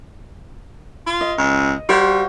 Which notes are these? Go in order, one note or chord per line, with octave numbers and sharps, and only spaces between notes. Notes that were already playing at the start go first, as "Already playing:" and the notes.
F4
D#5
C#2
G3 F#4 C5 F5